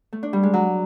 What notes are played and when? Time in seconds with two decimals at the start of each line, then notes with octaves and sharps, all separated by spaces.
0.13 A3
0.23 D4
0.33 G3
0.43 G#3
0.54 F#3